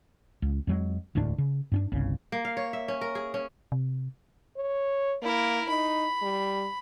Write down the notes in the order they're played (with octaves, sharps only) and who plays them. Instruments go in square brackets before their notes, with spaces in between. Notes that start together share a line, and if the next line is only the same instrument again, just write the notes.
[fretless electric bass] C#2
F2 F#3 G#3
E1 D2 A2 D4
C#3
G2 C#4 D4
G1 C2 C#3
[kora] A#3
F5
C#5
E5
C#4
A#4
G#4
C#4
[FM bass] C3
[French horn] C#5
[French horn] A#3 [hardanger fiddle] E4 A#4
[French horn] D#4 [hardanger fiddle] B5
[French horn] G3